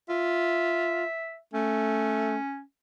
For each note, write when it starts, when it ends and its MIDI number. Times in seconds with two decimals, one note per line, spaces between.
0.09 1.04 65
0.09 1.37 76
1.53 2.36 57
1.53 2.61 61